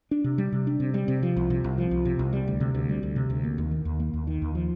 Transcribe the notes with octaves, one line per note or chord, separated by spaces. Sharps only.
D4
C3
G3
C3
D4
C3
G3
C3
F3
C2
C3
C2
F3
C2
C3
C2
G3
D2
C3
D2
G3
D2
C3
D2
A#3
D#2
D#3
D#2
A#3
D#2
D#3
D#2
F3